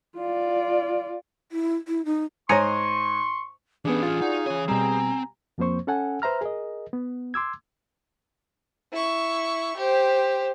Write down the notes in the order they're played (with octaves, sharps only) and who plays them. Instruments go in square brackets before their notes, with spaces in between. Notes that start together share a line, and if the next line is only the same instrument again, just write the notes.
[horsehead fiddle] F4 D5
[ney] E4
E4
D#4
[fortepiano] G#2 G#5 A#5 [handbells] C#5 C#7 [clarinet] C6 [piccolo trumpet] C#6
[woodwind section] G2 [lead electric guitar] E3 C#4 [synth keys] B3 D4 [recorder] G#4
[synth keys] F4
[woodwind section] G3 D4 F#4 [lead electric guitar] D#4
[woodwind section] C#3 [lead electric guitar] E3 G#5
[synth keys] B2 G3 [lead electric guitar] C4 [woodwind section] G#5 A#5
[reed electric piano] F2 F3 A#3 C4 C5 C#6
C#4 A4 F#5 G#5
B4 C5 E5 A#5 F6
G#4 A#4 D#5
B3
C6 D6 E6 G#6
[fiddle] E4 C#6
G4 C5